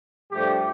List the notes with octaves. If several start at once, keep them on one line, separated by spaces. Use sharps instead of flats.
G2 F3 A3 G4